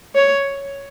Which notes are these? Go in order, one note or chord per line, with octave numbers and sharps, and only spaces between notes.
C#5